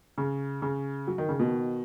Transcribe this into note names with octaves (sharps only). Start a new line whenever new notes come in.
C#3
C#3
F#3
D#3
C#3
B2 D#3